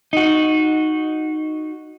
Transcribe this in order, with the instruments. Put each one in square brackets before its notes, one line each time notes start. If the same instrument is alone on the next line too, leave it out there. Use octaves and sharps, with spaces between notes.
[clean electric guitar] D#4 F#4